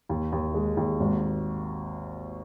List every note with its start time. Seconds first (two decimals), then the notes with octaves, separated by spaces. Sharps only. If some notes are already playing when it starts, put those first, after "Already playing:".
0.09 D#2
0.32 D#2
0.54 G#3
0.77 D#2
1.00 G#1